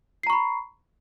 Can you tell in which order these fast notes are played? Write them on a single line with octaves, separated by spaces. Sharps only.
C7 A#5 C#6 B5